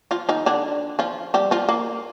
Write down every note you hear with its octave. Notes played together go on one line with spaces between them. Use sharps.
F3 F4
D#3 D#4
D3 D4
F3 F4
G3 G4
F3 F4
A#3